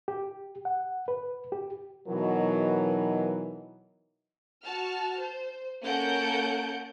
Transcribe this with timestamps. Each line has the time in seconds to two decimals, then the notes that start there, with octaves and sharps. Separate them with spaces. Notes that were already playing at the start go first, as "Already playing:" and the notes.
0.08 G4
0.65 F#5
1.08 B4
1.52 G4
2.07 B2 E3 F#3 D#4 A#4
4.63 F#4 A5 F6
5.20 C5
5.85 A#3 C#4 A4 F#5 G6 D7